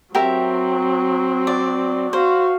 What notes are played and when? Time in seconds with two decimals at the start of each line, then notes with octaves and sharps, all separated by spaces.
0.15 F#3 C4 G4 A#4 E5
1.47 D5
2.13 F#4 C5 F5